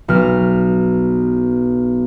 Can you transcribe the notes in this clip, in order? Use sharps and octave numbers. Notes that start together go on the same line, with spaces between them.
B1 F6